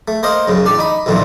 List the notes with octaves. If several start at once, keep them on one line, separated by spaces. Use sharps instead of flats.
A3
A#3 C5 D#5 F5
F#2 C#3
A1 D4 D5
D#4 B5
B1 F2 A#2 D3 E3